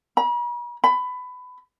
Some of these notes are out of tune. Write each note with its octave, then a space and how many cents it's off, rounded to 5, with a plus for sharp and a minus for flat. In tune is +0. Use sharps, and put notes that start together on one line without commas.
B5 -45
B5 +20